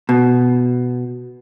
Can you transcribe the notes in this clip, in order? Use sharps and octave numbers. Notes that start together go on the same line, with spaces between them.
B2